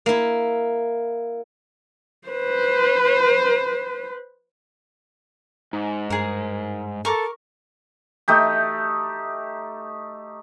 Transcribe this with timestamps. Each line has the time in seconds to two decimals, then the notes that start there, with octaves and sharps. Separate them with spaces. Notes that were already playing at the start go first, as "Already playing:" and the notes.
0.06 A#3 E4
2.28 B4 C5
5.73 G#2 D#4
6.10 G2 G#4 A#4
7.05 A4 A#4 C#6 D6
8.28 A3 D#4 G4